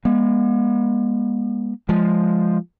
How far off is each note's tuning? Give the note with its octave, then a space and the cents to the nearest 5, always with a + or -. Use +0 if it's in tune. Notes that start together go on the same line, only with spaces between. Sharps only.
G#3 -30 B3 -45
F3 +0 G#3 +0